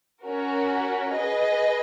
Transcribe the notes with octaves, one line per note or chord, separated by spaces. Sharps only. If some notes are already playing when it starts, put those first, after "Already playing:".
C#4 F#4 A#4
G#4 B4 D#5